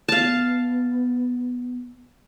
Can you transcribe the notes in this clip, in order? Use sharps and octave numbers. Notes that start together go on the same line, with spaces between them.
B3 F5 A5